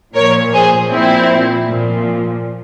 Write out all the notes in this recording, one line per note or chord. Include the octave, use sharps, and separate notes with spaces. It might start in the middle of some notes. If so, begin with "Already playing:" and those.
A#2 F3 A#4 C#5
G#4 C5
A#2 F3 C4 E4
A#2 F3